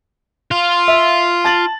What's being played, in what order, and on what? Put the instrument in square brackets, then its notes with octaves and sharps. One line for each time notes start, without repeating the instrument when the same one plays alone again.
[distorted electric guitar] F4
[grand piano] E5
A5 A6 F#7